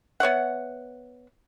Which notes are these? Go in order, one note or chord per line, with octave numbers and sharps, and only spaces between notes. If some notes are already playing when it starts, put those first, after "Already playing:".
B3 C#5 E5 F#5